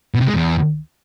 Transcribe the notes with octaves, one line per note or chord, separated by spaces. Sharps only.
B2
C3
G#3
E2